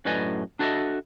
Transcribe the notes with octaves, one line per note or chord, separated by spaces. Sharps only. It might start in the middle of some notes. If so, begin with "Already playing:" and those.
F#2 A2 B4 D5 D#5 G#5
D4 F#4 A4 B4 D#5 E5